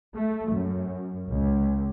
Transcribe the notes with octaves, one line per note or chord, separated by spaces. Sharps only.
A3
F#2
C#2